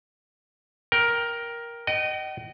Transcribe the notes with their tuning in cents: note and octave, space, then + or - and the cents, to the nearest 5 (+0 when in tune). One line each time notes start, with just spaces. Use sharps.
A#4 +10 G5 +0
D#5 -15 G5 -45